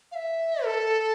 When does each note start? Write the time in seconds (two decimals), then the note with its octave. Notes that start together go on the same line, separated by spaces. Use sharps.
0.12 F5
0.15 E5
0.65 A4